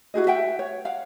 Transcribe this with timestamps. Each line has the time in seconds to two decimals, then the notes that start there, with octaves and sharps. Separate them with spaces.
0.14 E4 F#4 G#4 D#5
0.27 E5 F#5 G5
0.59 C#5
0.85 F5 F#5